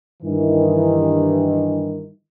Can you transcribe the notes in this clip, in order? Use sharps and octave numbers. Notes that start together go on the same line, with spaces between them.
G2 D#3 E3